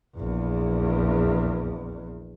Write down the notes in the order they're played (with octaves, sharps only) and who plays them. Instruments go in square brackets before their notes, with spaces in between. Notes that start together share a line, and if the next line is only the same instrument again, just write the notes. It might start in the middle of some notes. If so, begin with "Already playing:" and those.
[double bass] A#1 E2